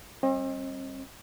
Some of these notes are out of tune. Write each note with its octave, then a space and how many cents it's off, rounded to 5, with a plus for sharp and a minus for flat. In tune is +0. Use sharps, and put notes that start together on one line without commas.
G3 +0 C4 +40 D#5 +0